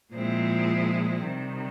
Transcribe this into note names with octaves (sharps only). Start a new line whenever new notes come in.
A#2 F3 G#3 C4 E4
C3 D#3 G3